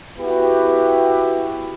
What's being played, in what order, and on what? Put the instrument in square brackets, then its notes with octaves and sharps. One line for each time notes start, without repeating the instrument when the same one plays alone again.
[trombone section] B3 E4 F#4 G4 B4